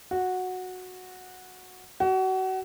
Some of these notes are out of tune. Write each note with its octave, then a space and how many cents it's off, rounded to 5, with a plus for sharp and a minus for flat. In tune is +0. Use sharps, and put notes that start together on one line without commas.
F#4 -10
F#4 +30